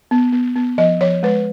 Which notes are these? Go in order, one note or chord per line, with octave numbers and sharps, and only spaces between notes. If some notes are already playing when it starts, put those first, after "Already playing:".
B3
B3
B3
F3 D#5
F3 C#5
G#3 B4